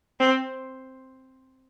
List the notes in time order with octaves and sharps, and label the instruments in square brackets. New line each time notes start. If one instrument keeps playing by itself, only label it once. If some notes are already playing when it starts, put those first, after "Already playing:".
[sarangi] C4